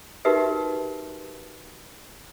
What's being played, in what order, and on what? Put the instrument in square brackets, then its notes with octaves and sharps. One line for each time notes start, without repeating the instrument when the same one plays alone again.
[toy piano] D#4 F#4 G4 A#4 B4 E5